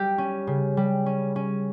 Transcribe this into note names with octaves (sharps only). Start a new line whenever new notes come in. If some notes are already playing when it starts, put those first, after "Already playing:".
Already playing: G3 G4
C#4
C#3
G3
C#4
C#4